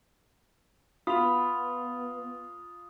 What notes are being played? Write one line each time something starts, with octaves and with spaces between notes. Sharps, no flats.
B3 F4 B5 D#6 F7